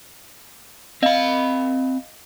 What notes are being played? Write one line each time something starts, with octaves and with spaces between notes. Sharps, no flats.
C4 D#5 F5 B5